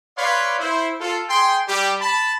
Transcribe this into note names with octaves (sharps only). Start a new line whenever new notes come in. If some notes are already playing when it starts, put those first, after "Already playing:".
B4 C#5 D5 F5 B5 C6
E4 C5
F4 A4
G#4 G5 C6
G3 G4
A5 B5